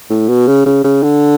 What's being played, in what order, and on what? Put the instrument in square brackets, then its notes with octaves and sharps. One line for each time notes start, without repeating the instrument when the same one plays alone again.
[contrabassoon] A2
B2
C#3
C#3
C#3
D3